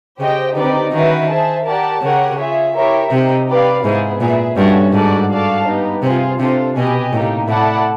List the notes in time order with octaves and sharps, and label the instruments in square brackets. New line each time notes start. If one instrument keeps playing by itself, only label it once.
[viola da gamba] C#3 [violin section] G4 C5 D#5 G5
[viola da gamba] D3 [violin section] C4 D#4 G4 B4 D5
[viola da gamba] D#3 [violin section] C#4 F#4 B4 E5
[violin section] G#4 C5 E5 A5
G4 A#4 D5 F#5 A5
[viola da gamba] C#3 [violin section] G4 A#4 C#5 F#5
[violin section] F4 G#4 C#5 E5
E4 G4 A#4 C#5 E5
[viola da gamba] C3 [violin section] D#4 G4 C5
[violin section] G4 B4 D5 F5
[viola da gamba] G#2 [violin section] B3 E4 G#4 C5
[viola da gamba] A#2 [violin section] G#4 B4 E5
[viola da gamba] G2 [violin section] C#4 F#4 A4 C#5 E5
[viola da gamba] G#2 [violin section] F#4 A4 D5 F#5
[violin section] F#4 A4 D5 F5 A5
B3 D#4 G4
[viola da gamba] C3 [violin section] F4 G#4 C5
[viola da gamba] C3 [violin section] D4 F4 A4 C5
[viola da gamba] B2 [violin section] G4 B4 D#5 G#5
[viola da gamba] A2 [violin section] A#3 D#4 G4
[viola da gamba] A2 [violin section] E4 A4 D5 F#5 A5